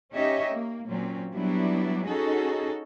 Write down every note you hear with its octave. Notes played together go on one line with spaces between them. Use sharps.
C#4 D#4 G4 C#5 D#5 E5
A#3
A#2 F#3 C4 C#4
F#3 G3 B3 D4 E4
C#4 D#4 F#4 G#4 A4